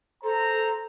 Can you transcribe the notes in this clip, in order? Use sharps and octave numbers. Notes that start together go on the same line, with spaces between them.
A4 C5 A#5